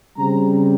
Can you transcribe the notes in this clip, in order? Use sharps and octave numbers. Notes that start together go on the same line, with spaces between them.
C#3 G3 C4 A#5